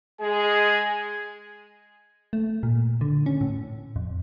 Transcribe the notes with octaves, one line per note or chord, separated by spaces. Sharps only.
G#3 G#4 G#5
A3
A#2
D3
C#4
A2
F2